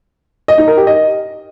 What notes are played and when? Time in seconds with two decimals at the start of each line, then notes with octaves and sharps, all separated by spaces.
0.48 D#5
0.58 D#4
0.68 A#4
0.77 G4
0.87 D#5